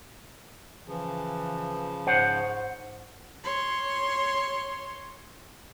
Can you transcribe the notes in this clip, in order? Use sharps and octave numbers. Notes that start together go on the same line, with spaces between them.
C#3 E3 F3
G#2 C5 C#5 F#5
C#5 C6